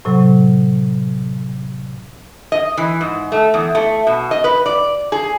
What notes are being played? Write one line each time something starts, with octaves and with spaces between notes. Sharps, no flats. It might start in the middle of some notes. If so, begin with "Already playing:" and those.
A2 C3 F#3
D#5
E3
G#2
A3
E2
A3
B2
D#5
B4
D5
G#4